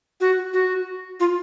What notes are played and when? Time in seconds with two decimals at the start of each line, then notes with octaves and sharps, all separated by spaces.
0.21 F#4
0.54 F#4
1.20 F4